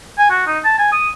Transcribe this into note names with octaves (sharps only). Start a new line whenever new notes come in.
G#5
F#4
D#4
A5
G#5
D#6